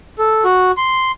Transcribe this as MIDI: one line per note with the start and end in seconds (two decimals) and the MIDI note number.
0.19 0.44 69
0.44 0.72 66
0.77 1.12 84